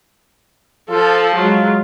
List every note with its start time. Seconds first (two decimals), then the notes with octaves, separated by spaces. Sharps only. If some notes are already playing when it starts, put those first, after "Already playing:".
0.90 F3 F4 A4
1.35 F#3 G#3 F4